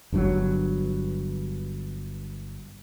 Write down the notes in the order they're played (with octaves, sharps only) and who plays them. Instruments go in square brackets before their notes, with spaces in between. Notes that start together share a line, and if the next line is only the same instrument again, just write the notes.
[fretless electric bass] G1 G2 B2 F#3